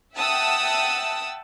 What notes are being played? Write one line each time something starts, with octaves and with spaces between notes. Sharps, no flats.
E5 F#5 G5 A5 D#6 E6